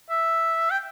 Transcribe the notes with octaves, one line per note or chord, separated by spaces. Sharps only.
E5
G5